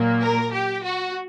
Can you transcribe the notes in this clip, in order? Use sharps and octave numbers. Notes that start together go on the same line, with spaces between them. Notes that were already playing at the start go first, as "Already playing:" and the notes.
Already playing: A#2 F#3 A#3
A#4
G4
F#4